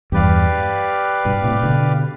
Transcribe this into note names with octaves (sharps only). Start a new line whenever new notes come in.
E2 G2 G4 B4 D5 F5
G2 B2
A2 C3
B2 D3